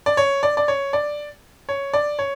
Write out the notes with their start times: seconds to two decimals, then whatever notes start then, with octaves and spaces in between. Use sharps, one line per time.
0.06 D5
0.17 C#5
0.43 D5
0.57 D5
0.68 C#5
0.93 D5
1.69 C#5
1.94 D5
2.19 C#5